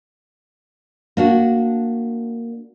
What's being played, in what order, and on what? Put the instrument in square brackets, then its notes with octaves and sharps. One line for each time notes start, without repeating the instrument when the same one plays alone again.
[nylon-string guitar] A#3 D4 F#4